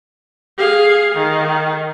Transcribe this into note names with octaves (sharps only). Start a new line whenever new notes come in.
G#4 F5
D#3